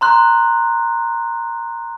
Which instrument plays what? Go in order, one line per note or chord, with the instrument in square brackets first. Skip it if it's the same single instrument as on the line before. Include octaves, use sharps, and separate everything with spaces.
[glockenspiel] A#5 C6 F#6